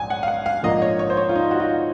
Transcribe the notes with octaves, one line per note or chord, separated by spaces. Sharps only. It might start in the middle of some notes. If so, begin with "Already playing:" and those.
Already playing: A#1 G#2 F#3 G#5
F#5
F5
F#5
F5
A#1 G#2 F3 A#3 D#5
C#5
C#5
C5
C#5
F4
D#4
F#4
F4